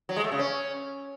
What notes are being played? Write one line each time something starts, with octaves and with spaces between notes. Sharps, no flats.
F#3
G#3
A3
C#3
C#4